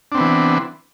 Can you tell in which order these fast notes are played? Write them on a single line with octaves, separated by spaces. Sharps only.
D4 C4 B3 E3